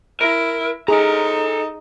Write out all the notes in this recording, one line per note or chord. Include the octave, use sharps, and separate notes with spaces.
E4 A#4
D#4 G#4 A4 A#5